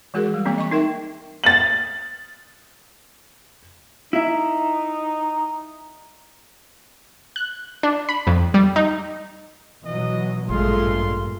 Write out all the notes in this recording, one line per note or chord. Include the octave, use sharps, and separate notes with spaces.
E3 G#3 F#4 G#4 A#4
G3
E3 G3 A#3 C4 C#4
D#5 C#6
D#4 A#4 E5 G5
A6 F#7
D#4 E4 E5
F#6
D4
B5
F2
G3
D#4
B2 E3 F#3 D#5
A1 G2 A#2 G#3 A3 F4 C6